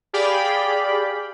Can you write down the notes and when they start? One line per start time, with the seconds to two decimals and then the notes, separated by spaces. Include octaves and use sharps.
0.13 G4 G#4 D5 F5 G5 B5